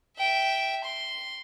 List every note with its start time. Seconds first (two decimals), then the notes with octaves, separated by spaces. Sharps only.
0.19 E5 G5
0.85 C6